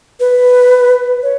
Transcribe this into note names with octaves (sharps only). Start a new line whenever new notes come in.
B4
C#5